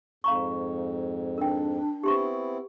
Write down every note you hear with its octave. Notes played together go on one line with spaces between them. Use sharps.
F2 G#2 F5 A#5 C#6
D4 A#4 G5
B3 C4 E4 G4 C6 C#6